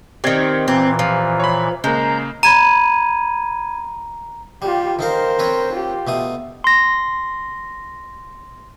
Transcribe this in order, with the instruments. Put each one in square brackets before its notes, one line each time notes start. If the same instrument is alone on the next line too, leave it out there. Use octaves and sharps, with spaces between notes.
[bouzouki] D#3 C4 [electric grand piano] G4 D5 G#6
[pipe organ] A#2 E3 [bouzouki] C4
[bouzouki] F3
[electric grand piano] C#5 B5
[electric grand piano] C#3 A#3 [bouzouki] G#3 [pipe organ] A#5 G6
[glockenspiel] A#5 [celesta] B5 G#6 D#7
[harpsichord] G3 [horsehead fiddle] F4 G4
[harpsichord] D#3 D#4 F5 [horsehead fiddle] A#4 C5
[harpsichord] C4 B4 C#5
[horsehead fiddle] F4 G4
[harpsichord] B2 A3 D#6
[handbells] C6 A#6